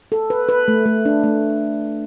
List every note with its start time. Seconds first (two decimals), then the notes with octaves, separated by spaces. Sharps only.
0.12 A4
0.30 B4
0.49 B4
0.68 A3
0.86 A3
1.05 D4
1.24 A3